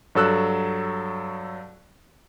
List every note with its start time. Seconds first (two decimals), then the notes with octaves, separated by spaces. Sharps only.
0.15 G2 F#3 A4 E6 F#6